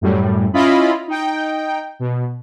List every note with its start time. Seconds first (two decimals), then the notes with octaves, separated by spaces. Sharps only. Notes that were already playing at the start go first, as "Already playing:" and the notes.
0.01 F#2 A2 G3
0.53 C#4 E4 F4 D#5 B5
1.08 D#4 G5
2.00 B2